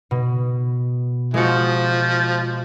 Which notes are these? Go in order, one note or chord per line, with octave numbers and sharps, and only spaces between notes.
B2
F3 G#3 F#4